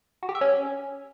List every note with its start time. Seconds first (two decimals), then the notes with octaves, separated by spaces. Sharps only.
0.23 F#4
0.29 G4
0.35 E5
0.41 C#4